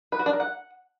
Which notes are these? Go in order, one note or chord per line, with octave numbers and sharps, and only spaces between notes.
B4
F#4
D4
A#4
F#5